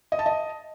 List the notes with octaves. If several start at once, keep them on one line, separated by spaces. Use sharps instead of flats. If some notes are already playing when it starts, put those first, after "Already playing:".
D#5
A5
D#5